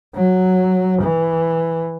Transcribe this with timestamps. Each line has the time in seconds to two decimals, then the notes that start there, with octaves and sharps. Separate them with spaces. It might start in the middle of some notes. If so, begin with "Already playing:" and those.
0.15 F#3
1.03 E3